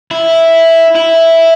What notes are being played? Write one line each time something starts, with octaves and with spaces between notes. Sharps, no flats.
E4
E4